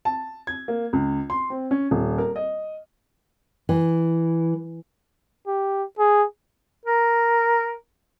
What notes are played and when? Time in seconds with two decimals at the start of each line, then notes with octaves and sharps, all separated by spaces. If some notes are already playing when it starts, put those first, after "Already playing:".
0.05 A5
0.47 G#6
0.68 A#3
0.93 C#2
1.30 C6
1.50 C4
1.71 C#4
1.91 D#1
2.18 A#4
2.36 D#5
3.69 E3
5.47 G4
5.99 G#4
6.86 A#4